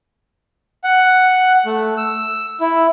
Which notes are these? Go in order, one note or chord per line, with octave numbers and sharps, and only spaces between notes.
F#5
A3
E6
E4